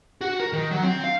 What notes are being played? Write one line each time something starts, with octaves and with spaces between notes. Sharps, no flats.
F#4
A#4
D#3
F#3
C4
F5